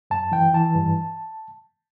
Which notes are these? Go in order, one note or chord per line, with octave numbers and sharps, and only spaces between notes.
F#2 A5
E3 G5
E3 A5
G2